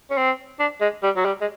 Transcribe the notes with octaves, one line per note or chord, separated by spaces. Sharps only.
C#4
C4
D4
G#3
G3
F#3
G3
G#3